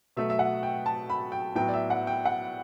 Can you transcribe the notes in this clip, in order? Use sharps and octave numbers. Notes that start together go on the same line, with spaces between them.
B2 F#3 A3 E5
E5
F#5
G5
A5
B5
G5
A2 F#3 B3 G5
D5
E5
F#5
G5
F#5